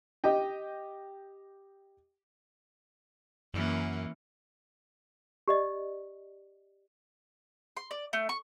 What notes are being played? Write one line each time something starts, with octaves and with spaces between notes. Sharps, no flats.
G4 D#5 G5
F#2 E3 A#3 C#4
G4 D5 D#5
C6
D5
A3
C#6